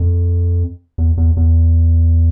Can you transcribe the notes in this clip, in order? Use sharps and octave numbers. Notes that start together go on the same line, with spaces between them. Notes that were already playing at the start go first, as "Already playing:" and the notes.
Already playing: F2
E2
E2
E2